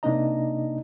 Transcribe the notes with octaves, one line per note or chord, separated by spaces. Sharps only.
C3 A#3 D4 D#4 D#5 A#5